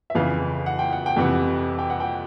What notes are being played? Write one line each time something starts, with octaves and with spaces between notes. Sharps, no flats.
E5
F2 C#3 E3 F5
F#5
G5
F#5
G5
F2 C3 E3 F#5
G5
F#5
G5